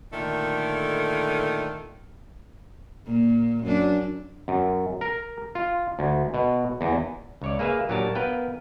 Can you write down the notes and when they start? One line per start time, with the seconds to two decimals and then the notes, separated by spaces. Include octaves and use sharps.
0.13 A#2 D3 D#3 A3
3.06 A#2
3.63 F#2 D4
4.48 F#2
5.01 A#4
5.55 F4
5.99 D2
6.34 B2
6.81 E2
7.42 C#2 C#5 D5
7.59 A#3 G#4 B4 E5 F5
7.89 A#2 F#3 D4 G4 A#4 A5
8.15 B3 A#4 B4 F5 G5